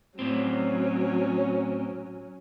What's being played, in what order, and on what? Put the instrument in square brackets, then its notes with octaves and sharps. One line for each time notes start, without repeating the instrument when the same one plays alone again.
[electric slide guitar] A2 C4 [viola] F#3 C#4